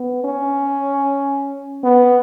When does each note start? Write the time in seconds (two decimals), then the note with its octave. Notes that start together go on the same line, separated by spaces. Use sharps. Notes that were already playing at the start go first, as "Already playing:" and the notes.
Already playing: B3
0.24 C#4
1.84 B3